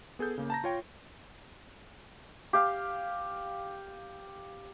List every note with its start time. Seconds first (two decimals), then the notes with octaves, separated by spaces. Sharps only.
0.19 B3 G#4 A4 G6
0.38 C#3 A#3
0.50 A5 A#5 A#6
0.64 F4 C#5 G5
2.53 G4 F5